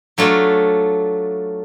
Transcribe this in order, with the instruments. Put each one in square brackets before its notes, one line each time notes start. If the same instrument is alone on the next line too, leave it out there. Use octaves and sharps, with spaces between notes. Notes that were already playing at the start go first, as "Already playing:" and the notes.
[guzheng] F#3 A3 D4 F4